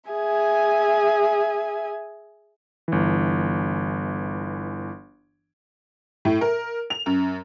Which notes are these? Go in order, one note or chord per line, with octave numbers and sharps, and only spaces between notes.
G#4 E5 G#5
G1 E3
A2
A#4
F7
F#2